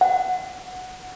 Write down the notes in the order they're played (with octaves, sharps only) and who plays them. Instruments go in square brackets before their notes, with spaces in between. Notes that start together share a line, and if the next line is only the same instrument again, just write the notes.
[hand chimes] F#5